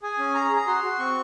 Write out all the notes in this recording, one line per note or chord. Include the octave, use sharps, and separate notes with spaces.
G#4 G#5
C#4
G#4 A#5
G#4
A#5
F#4 C6
F#4
C4 C#6